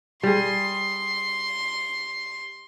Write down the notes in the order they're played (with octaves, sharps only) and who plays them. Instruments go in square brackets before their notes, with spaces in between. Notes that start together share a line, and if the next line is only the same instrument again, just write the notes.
[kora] G3 G#4 [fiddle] C6